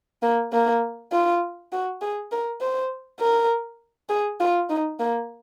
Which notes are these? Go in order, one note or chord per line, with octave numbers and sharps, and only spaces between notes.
A#3
A#3
F4
F#4
G#4
A#4
C5
A#4
G#4
F4
D#4
A#3